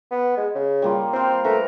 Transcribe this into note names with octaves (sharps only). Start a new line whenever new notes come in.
B3
G#3
C#3
G3 A#3 F4
C4 C5 F5
A3 A#4 B4 A#5